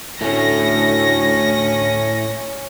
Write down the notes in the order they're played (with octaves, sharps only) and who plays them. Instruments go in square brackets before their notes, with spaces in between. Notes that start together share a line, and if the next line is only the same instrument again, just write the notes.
[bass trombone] D2 [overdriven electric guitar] A2 A3 [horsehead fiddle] C#4 [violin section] A#6